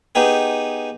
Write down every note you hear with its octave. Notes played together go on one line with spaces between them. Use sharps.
B3 D#4 G4 G#4